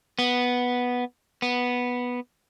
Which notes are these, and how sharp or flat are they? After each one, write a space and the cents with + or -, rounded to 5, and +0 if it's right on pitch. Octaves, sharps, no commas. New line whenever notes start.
B3 -5
B3 -5